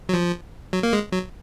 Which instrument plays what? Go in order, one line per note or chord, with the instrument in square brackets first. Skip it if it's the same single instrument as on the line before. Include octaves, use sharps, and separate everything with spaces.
[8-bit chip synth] F#3
F3
F#3
A#3
G#3
F#3